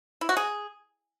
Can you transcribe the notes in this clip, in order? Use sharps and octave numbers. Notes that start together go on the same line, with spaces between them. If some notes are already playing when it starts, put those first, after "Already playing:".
E4
F#4
G#4